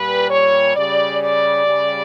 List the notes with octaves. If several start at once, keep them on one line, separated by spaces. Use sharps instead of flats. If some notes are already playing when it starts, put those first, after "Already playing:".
Already playing: A#2 G3 B4
C#5
C#3 G3 D5
D5
C#3 G3